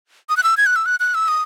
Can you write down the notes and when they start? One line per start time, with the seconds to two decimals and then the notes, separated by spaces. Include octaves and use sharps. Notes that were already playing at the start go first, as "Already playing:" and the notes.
0.29 D#6
0.37 F#6
0.44 E6
0.57 G#6
0.66 F#6
0.76 E6
0.86 F#6
1.00 F#6
1.15 E6
1.28 D#6